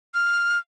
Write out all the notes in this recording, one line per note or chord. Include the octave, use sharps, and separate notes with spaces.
F6